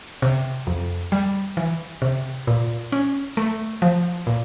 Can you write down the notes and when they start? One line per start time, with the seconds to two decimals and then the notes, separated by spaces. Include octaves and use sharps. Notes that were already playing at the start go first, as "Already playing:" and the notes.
0.22 C3
0.67 F2
1.12 G3
1.57 E3
2.02 C3
2.47 A#2
2.92 C#4
3.37 A3
3.82 F3
4.27 A#2